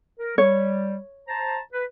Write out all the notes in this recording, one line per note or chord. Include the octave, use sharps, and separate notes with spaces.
A#4
G3 C#5
C5 A5 A#5
B4